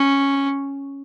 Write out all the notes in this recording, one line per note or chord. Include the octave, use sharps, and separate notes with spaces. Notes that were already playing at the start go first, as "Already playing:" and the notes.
Already playing: C#4